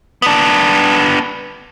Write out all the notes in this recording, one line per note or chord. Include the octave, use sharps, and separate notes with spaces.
B3 D4